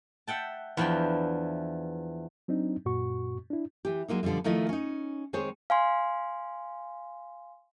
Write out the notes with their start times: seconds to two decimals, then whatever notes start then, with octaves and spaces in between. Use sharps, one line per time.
0.27 E5 F#5 G5 A5
0.77 E2 E3 F3 D4 G5
2.48 F#3 C4 D4 D#4
2.85 F#2 A#2 F#4 C#6
3.50 D4 E4
3.85 E3 G4
4.08 F#3 G#3 A#3 D#4
4.23 B2 D3 F3 G3 G#3
4.44 D#3 F3 A3 E4 D#5
4.69 C#4 D#4
5.33 D#3 G#3 C4 G#4 C5 C#5
5.70 F5 G#5 C6